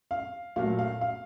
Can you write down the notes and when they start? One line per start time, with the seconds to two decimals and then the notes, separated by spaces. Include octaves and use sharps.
0.11 F5
0.56 A#2 F#3 A3 F5
0.79 F5
1.01 F5